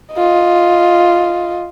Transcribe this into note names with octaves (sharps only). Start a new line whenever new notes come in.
F4 D#5